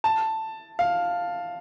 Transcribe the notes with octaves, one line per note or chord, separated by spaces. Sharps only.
A5
F5